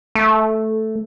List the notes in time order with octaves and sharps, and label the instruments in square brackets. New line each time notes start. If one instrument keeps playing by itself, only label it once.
[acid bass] A3